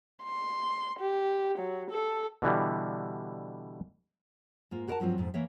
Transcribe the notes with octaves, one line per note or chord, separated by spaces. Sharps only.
C6
G4
F#3
A4
B2 D3 E3 G3
G#2 A#3 F4
F#4 G#4 A#4 D5 F#5 A5
G2 F3 F#3 C4 F4
F2 G#2 B2
E3 A#3 C#5 E5